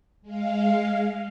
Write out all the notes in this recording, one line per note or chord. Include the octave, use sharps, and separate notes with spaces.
G#3 F5